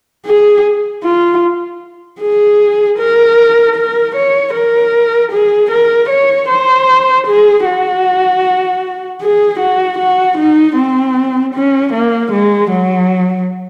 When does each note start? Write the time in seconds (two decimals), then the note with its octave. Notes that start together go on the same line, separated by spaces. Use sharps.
0.26 G#4
1.03 F4
2.20 G#4
2.99 A#4
3.76 A#4
4.15 C#5
4.54 A#4
5.32 G#4
5.71 A#4
6.09 C#5
6.49 C5
7.27 G#4
7.65 F#4
9.21 G#4
9.60 F#4
9.99 F#4
10.38 D#4
10.76 C4
11.54 C#4
11.93 A#3
12.32 G#3
12.71 F#3